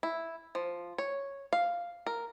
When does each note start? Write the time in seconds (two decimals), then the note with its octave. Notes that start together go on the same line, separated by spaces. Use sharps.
0.03 E4
0.55 F3
0.98 C#5
1.53 F5
2.06 A#4